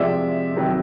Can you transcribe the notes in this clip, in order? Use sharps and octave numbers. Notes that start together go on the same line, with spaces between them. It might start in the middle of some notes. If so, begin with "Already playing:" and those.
Already playing: C3 F3 G#3 D5 E5
C3 D#3 F#3